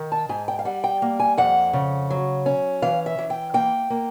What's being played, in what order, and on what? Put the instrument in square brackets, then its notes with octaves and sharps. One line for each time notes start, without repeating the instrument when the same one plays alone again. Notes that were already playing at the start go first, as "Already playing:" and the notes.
Already playing: [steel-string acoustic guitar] D#3
A5
G#2 G#5
G5
F5
G3 F#5
G5
A#3
G#5
F2 F#5
C#3
F#3
C#4
E3 F5
E5
E3
G5
A#3 G5
A#3